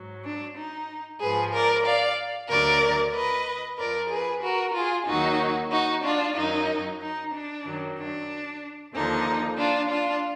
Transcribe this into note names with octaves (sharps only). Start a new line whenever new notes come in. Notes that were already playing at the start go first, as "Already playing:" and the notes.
Already playing: G#2 F#3
D4
D#4
G#2 F3 G#4 B4
A#4 D5
D5 F5
D2 D3 F#3 A#4 D5
B4 D#5
F2 F3 A#4 D5
G#4 B4
F#4 A#4
F4 G#4
D#2 D#3 F#3 D#4 F#4
D#4 F#4
D4 F4
F#2 D#3 F#3 D#4
D#4
D4
F#2 D#3 F#3
D4
D#2 D3 F3 D#4
D4 F4
D4 F4